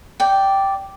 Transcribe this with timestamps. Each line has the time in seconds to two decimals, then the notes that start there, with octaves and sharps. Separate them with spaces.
0.20 D5 G5